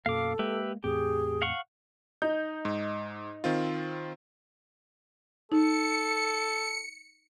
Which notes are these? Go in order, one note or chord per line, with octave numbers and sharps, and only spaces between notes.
F#2 B2 A#3 A4 F5 D6
G#3 A#3 G4 B4 E5
E2 A2 C4 G4 G#4
F5 F#5 C#6
D#4 G6
G#2
D#3 C4 F4
D#4 A4 C#7